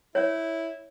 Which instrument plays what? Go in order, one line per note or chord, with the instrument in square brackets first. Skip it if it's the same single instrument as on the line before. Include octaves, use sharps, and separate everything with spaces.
[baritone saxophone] E4 [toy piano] C#5